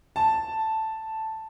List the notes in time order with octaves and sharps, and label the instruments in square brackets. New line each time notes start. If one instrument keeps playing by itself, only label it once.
[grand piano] A5